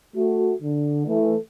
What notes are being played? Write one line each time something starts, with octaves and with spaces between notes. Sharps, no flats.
A3 F#4
D3
E3 A3